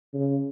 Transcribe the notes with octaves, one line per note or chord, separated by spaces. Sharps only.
C#3